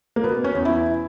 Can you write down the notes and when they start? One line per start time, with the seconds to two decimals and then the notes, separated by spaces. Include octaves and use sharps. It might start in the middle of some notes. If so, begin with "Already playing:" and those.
0.16 A#3
0.24 B2 B3
0.44 C#4
0.55 E2
0.65 E4